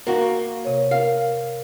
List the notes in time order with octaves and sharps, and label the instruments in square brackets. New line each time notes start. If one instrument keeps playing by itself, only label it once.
[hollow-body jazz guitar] A#3 F#4
[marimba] C3 C#5
[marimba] A#4 [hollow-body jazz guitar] F5